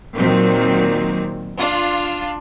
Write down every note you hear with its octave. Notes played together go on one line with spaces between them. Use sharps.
A#2 D#3 F#3 C4
D4 F4